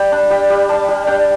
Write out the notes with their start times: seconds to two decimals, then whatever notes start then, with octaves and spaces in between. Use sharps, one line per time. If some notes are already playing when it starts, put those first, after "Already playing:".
Already playing: G3 G5
0.12 D4
0.30 G3 G5
0.50 G3
0.69 G3 A5
0.88 G3
1.07 D4 G5